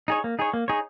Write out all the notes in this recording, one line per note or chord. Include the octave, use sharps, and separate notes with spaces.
D#4 G#4 C#5
A#3
D#4 G#4 C#5
A#3
D#4 G#4 C#5